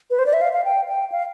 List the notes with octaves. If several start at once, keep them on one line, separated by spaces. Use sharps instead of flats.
B4
C5
D5
E5
F5
F5
G5
G5
F5